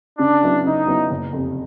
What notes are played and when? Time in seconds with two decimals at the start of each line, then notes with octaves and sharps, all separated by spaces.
0.19 C#3 D4
0.43 F#3 B3 E4
0.65 C#3 D#4
0.87 F#3 B3 E4
1.10 F#1
1.33 F2 C3